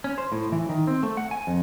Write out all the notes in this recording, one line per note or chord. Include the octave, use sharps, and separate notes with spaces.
C#4
C5
A2
E3
D#3
C4
A3
F#5
G#5
F2